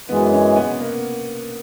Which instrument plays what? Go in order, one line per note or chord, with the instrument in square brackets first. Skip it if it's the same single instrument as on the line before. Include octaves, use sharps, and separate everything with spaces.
[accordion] F#2 E3 G#3 [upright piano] B3
[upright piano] C#4
B3
A#3